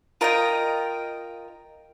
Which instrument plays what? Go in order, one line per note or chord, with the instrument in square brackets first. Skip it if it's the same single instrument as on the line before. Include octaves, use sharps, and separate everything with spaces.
[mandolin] F4 A#4 D#5 G5